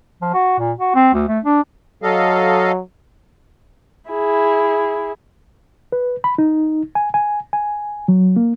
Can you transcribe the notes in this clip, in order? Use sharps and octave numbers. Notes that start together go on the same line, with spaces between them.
F3
F#4
A#2
F#4
C4
D2
A3
D4
F#3 A4 D#5 F5
E4 G#4
B4
B5
D#4
G#5
G#5
G#5
F#3
A#3